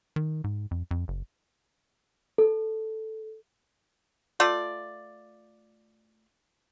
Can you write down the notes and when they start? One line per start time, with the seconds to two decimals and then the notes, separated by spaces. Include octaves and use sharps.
0.16 D#3
0.44 G#2
0.71 F2
0.91 F2
1.08 F#1
2.38 A4
4.40 A3 F4 D5